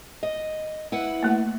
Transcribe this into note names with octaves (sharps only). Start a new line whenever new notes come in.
D#5
E4 B4 F#5
A3 A#3